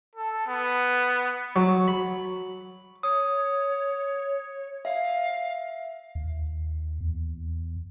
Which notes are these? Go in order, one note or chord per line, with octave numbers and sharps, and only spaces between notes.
A4
B3
F#3
B5
C#5 D#6
E5 F5
D#2
E2